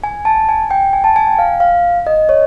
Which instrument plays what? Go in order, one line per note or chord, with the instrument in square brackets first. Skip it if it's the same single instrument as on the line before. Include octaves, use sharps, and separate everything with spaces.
[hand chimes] G#5
A5
G#5
G5
G#5
A5
G#5
G5
F5
F5
D#5
C#5